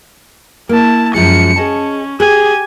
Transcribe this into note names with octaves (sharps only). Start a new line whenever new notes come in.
A#3 E4 A5
F#2 F3 G#3 C#7
C#4 G#4 D#5 A5
G4 G#4 G#5